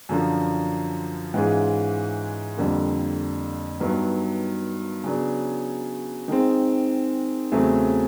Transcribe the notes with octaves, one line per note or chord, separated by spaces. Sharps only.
F#2 D3 F3
G#2 E3 G#3 C#4 F4
F2 D3 G3 A#3
G2 D#3 F#3 B3
C#3 F#3 B3 D4
D#3 G#3 C4
E2 C#3 F#3 A3 C4